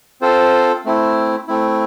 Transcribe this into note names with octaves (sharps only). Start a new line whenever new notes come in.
C4 F4 A4 C5
A3 C4 E4
A3 C4 E4